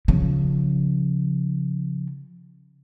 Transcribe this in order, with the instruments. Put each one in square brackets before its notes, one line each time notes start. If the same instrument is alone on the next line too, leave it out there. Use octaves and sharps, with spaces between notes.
[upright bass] C#3 F3